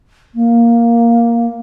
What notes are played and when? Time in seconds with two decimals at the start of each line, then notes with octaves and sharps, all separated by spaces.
0.34 A#3